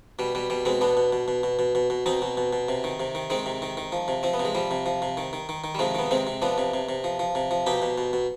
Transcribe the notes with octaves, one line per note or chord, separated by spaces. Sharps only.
B2 G3
B2 G3
B2 G3
B2 G#3 C4
B2 B3 D4
B2
B2
B2
B2
B2
B2
B2
B2 C4 D#4
B2
B2
B2
C3
D#3
C3
D#3
D#3 G#3 C4
C3
D#3
D#3
F3
C3
F3 C4
B3
C3
G#3
F3 G3
C3
F3
C3
D#3
D#3
D#3
D#3
G3
C3 F3 G#3
D#3 B3
C3 G#3 C4
C3
F3 B3 D4
C3
C3
C3
F3
F3
C3
F3
B2 D#4 G4
B2
B2
B2